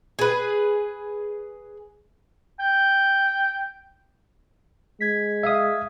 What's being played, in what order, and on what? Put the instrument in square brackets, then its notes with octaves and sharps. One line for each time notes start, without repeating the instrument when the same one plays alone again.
[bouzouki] G#4 B4
[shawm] G5
[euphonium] G#3 [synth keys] G#6 B6
[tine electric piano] E5 F5 D#6